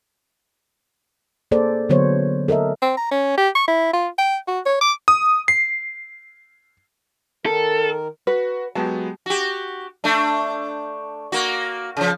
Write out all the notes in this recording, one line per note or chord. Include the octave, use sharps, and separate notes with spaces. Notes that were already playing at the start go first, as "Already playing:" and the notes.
A#3 G#4 A4 C5 D5
D3 F#3 B3 C5 C#5
A4 A#4 D#5 E5
C4
A#5
C#4
G4
C#6
E4
F4
G5
F#4
C#5
D6
D#6
C7
D#3 A4 A#4
F#4 B4
F#3 G#3 B3 G4 A5
F#4 G4
A3 D4
A#3 F#4
C#3 F3